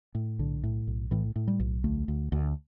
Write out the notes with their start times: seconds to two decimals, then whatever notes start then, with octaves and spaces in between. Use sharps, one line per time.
0.15 A2
0.39 B1 D3
0.63 A2
0.87 B1
1.11 A2 E3
1.36 A2
1.48 G3
1.60 B1
1.84 D2 A3
2.08 D2
2.32 D2